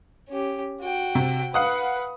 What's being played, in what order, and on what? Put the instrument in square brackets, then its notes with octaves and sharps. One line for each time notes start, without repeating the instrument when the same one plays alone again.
[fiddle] C#4 G4
F#4 G5
[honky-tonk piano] C3
[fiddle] B4 [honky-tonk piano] F5 F#5 D#6